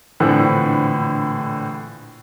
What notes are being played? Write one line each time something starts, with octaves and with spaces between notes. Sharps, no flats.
A#1 A2 D3 E3 C4 F#5